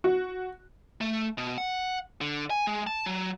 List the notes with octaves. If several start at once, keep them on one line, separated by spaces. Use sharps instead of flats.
F#4
A3
B2
F#5
D3
G#5
G#3
A5
F#3